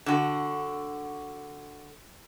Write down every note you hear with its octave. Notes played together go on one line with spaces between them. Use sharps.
D3 F#4